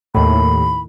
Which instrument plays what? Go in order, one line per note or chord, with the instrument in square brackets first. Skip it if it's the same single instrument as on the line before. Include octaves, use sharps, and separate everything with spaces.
[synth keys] D#2 A2 [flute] B5